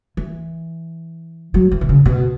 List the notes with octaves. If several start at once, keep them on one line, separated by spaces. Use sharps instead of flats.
E3
F#3
E3
B2
C#3
B2